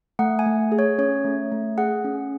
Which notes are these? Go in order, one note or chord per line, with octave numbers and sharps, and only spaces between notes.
A3 F#5
G#5
A3
G#4
C#5
C#4 C#5
A3
A3
G#4 F#5
C#4